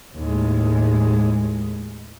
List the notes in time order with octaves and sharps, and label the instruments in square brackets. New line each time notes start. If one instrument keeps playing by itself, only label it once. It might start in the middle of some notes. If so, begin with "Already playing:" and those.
[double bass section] D#2 A2 G#3